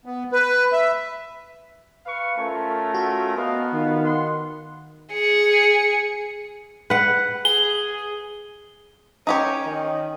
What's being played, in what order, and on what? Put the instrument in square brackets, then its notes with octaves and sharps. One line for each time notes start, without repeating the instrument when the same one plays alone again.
[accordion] B3
B4
E5
[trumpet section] B4 F5 C#6
[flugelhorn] A3 [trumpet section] C#4 F4 A#4
[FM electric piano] F#4
[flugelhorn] B3 [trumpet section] A#4 D#5 F5
[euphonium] D#3 [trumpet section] F4 F5
[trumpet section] F#5 C6
[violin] G#4 C#7
[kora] B4 F#5
[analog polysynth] G#4 [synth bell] G7
[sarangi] C#4 [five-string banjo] D#4 G4 C#5
[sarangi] D#3